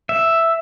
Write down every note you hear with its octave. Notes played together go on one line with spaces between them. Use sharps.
E5